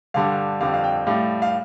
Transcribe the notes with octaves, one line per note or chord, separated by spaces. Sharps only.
G2 D3 G3 F5
F2 D3 G3 F5
F5
G5
A2 G3 F5
F5